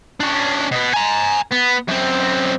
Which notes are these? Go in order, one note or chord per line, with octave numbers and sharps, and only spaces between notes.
C#4 D4
B2 B3
G#5 A#5
B3
F#2 C4